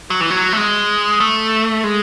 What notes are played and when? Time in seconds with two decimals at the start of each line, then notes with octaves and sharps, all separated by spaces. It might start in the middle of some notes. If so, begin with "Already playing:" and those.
0.10 F#3
0.20 E3
0.30 F#3
0.53 A3
0.57 G#3
1.20 A3
1.84 G#3